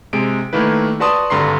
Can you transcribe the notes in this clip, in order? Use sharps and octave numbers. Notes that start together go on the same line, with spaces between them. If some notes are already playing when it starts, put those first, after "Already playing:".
C3 G#3 D7
D#3 A3 A#3 E4 B4
F#4 B4 D5 A5 C6 D#6
G#1 G2 D3 A#5 C6 C7